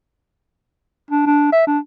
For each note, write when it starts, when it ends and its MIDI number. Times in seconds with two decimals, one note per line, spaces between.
1.11 1.25 62
1.27 1.48 62
1.53 1.63 76
1.67 1.79 62